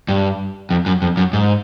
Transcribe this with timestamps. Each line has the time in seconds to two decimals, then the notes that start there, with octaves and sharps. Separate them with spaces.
0.08 G2
0.70 F2
0.86 F#2
1.02 F2
1.17 F#2
1.33 G#2